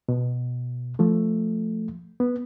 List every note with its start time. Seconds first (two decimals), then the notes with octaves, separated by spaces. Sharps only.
0.09 B2
0.99 F3 A3
2.20 B3